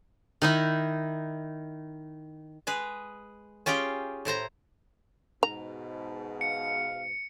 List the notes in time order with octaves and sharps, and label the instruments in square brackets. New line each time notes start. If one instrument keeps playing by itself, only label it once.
[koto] D#3 D#4 E4
G#3 G#4 B4
C#4 F4 G4 G#4 G5
A2 E4 C5 A#5
[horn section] G#2 B2 [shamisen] A#5
[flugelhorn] F5 [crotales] C#7